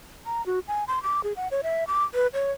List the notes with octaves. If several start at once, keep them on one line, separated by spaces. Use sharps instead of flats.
A#5
F#4
G#5
C6
D6
G#4
F#5
C#5
E5
D6
B4
C#5